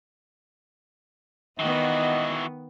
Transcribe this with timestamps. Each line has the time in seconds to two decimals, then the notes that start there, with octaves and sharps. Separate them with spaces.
1.59 D#3 E3 B3 F#4 D#5